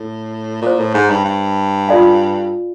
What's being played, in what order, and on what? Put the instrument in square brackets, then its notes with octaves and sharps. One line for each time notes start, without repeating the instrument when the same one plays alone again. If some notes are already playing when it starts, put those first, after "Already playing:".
Already playing: [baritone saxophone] A2
[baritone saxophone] A#2 [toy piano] E4 A4 C5
[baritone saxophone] A2
G#2
G2
G2
[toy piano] F4 A4 D5 F5 G#5